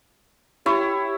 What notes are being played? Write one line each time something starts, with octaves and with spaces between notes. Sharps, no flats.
E4 G4 C#5